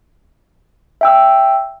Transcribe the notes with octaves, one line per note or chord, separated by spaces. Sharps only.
E5 G5 E6